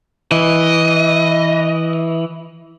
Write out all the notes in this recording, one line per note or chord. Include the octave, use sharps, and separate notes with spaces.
E3 D#5